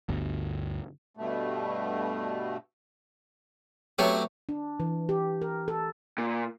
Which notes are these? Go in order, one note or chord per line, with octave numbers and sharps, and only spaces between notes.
G1 D2
G2 B2 A3
C3 F#3 A3 B3 G4 C#5
D4
E3
G4
A#4
A4
A#2